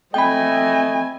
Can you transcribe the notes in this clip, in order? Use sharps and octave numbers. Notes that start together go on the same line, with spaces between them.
A3 C4 D#5 G5 G#5 B5